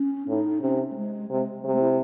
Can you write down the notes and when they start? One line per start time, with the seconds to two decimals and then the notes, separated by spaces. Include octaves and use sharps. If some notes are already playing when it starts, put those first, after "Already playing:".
Already playing: C#4
0.28 A2 D#4
0.62 C3 C#4
0.91 A3
0.96 G#3
1.30 C3 G#3
1.64 C3 G#3
1.72 A3
1.81 E4